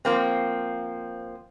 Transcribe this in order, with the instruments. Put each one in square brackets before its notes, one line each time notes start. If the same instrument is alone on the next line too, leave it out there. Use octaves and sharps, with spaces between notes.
[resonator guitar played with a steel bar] F3 A#3 C4